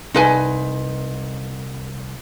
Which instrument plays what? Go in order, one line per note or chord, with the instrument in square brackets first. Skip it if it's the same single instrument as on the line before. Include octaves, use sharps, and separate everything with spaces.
[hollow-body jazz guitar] C2 [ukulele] D#4 B4 G#5